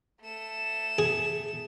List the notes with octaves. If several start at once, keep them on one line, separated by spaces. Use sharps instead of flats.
A3 E7
G#4